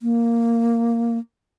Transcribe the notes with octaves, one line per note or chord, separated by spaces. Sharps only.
A#3